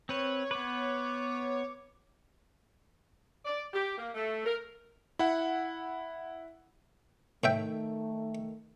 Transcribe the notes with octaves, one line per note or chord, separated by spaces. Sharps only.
C4 B4 C#5
B3 B4 D6
D5
G4
A#3
A3
A#4
E4 F#5
A2 D#3 A3 E5 G5